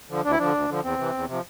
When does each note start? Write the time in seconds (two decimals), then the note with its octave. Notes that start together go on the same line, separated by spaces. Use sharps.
0.09 D3 F3
0.24 D2 D4
0.31 E4
0.38 D3 F3 D4
0.54 D2
0.69 D3 F3
0.83 E2 C4
0.99 C3 E3
1.14 E2
1.27 C3 F3